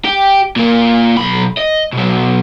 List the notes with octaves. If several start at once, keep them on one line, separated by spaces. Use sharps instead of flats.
G4
A#2 A#3
B1 B5
D#5
B2 F#3